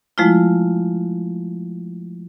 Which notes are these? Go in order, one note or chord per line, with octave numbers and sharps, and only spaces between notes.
F3 G#3 A3 E4 F4